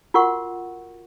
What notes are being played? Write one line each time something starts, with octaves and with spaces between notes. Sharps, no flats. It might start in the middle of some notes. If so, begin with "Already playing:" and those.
F4 F#4 A#4 F#5 C#6